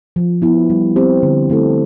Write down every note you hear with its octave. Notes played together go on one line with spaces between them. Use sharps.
F3
B3 E4
G3
C4 G4 C5
D3
A3 C4 E4 A4